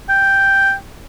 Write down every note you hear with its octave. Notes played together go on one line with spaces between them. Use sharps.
G5